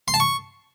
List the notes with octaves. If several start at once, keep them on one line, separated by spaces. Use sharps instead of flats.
C6
A5
C#6